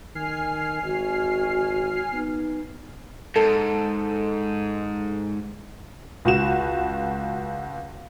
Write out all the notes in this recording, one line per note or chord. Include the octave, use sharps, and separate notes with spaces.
D#3 G#5 F6 C7
G#1 F#4
B3 D#4
G#2 A4
C#2 F#4 E7